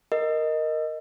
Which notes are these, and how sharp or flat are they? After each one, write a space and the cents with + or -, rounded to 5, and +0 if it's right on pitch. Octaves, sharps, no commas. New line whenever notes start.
A#4 +0 D#5 +0